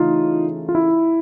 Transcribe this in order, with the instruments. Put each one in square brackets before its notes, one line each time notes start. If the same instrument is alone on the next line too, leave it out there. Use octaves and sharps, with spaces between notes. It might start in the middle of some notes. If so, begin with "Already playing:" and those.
Already playing: [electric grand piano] C#3 E3 A3 D#4 F4
F4
E4